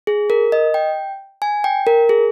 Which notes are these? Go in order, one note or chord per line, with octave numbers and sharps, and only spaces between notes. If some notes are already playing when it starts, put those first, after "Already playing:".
G#4
A#4
D#5
G5
G#5
G5
A#4
G#4